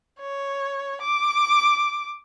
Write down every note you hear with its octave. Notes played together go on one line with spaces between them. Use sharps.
C#5
D6